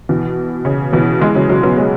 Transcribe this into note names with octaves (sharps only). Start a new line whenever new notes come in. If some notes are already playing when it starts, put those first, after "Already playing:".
B2 E3
C#3
B2 E3
E3 G#3
C#3 F#3
C#3 F#3
F#3 B3
G#3 C#4